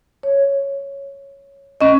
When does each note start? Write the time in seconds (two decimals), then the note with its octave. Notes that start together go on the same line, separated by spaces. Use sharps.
0.23 C#5
1.81 C#4 D#5